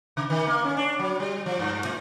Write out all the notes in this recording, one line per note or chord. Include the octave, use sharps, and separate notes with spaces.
C#3
D#3
A#3
C#4
D4
F#3
G3
F3
G2
A2